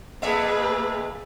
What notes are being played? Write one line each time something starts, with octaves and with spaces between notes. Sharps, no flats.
F2 A#2 A#3 G#4 B4 E5